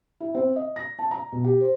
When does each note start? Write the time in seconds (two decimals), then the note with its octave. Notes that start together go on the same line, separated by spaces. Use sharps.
0.20 E4
0.35 C4
0.56 D#5
0.76 A#6
0.99 A5
1.11 A#5
1.32 B2
1.44 G4
1.61 C5